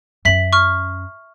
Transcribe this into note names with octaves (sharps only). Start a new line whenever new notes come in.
F#2 C#4 E5 B6 F#7
C#6 F6